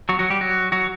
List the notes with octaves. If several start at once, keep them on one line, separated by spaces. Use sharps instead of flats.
F#3 F#4
F#3 F#4
G3 G4
F#3 F#4
F#3 F#4